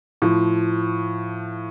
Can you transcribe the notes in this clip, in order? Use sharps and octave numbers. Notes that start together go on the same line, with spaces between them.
A2 F3